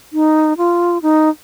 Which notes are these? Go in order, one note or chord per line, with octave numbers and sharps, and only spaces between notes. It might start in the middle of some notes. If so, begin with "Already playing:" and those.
D#4
F4
D#4